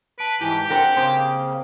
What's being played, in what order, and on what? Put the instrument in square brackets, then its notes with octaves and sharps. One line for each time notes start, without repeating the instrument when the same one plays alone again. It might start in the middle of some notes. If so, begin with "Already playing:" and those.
[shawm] B4 [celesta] A5 D7
[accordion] G#2 E3 [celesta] E4 G#5 A5 [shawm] G4
[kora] C4 D4 A#4 [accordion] F#5 F#6 [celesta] G5
[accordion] C#3 A#3 [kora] C4 G#4 C5